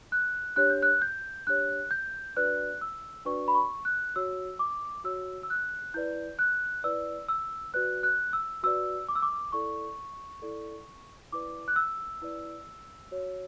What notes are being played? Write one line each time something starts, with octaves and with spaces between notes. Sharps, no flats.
F#6
D4 G4 C#5 F#6
G6
F#6
G6
D4 G4 C#5 F#6
G6
D4 F#4 B4 D5 F#6
E6
D4 F#4 B4 D5 C#6
B5
C#6
F#6
F#4 C#5 E6
D6
F#4 C#5 E6
E6
F#6
E4 B4 D5 G6
F#6
E4 B4 D5 E6
E6
F#4 B4 D5 F#6
F#6
E6
F#4 B4 D5 E6
D6
E6
D6
E4 A4 D5 C#6
E4 A4 D5
E4 B4 D5 D6
F#6
E6
E4 B4 D5
F#4 C#5